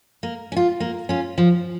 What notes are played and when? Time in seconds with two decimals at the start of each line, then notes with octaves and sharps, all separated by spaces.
0.23 A#3
0.52 C#4
0.56 F4
0.80 A#3
1.09 C#4 F4
1.38 F3